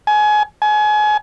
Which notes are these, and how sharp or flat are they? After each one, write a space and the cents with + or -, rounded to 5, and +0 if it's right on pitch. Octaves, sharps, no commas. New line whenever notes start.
G#5 +25
G#5 +30